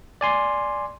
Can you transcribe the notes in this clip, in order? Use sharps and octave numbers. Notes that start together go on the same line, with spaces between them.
D5 G#5 C6